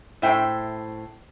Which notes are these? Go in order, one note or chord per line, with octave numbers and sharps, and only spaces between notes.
A2 C5 E5 G5